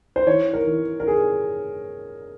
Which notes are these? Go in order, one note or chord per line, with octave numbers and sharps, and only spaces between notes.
C5
E3 C#5
A#4
E3
A#4
G#4